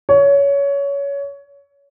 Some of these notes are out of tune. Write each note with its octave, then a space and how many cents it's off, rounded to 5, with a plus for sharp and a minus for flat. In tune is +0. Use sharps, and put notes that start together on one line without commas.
C#5 +20